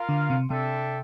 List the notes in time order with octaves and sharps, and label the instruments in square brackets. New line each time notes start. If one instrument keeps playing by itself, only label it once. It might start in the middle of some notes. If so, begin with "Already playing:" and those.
Already playing: [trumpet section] F4 A#4 F5
[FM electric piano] D3
C3
[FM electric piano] C3 [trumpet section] D4 A4 E5 G5